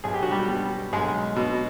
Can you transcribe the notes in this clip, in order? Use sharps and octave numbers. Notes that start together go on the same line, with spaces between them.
B1 G#4
G4
F#4
G3 G4
B2
B1 G#3 G#4
B2